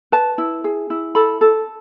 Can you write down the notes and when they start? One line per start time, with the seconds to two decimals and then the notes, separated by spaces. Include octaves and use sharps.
0.12 B4 A5
0.38 E4
0.64 G#4
0.90 E4
1.15 A4 B5
1.41 A4